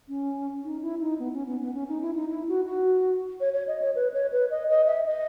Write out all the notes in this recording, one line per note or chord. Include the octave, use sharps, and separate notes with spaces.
C#4
D#4
E4
D#4
B3
C#4
B3
B3
C#4
D#4
E4
D#4
E4
F#4
F#4
C#5
C#5
D#5
C#5
B4
C#5
B4
D#5
D#5
E5
D#5